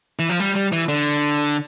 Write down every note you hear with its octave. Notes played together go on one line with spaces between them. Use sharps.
E3
F3
G3
G3
E3
D3